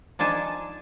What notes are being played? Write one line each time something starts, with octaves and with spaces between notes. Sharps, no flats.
F3 D4 D#4 G#5 A5